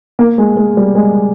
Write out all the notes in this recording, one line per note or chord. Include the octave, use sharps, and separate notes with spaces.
A#3
G#3
G#3
G3
G#3